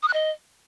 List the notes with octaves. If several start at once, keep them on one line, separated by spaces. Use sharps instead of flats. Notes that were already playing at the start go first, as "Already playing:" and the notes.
D#6
F#6
D#5